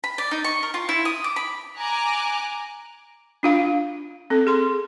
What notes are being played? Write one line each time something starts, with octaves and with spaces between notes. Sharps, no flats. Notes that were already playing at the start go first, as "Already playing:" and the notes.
B5
D5
D#4
C#6
A#4
F4
E4
D#6
D6
B5
G#5 A#5 D6 F#6
D4 F4 F5
C4 A4
G#4 C6